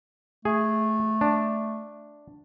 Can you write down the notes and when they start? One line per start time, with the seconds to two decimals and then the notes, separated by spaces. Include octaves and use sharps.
0.45 A3 G#4
1.21 D4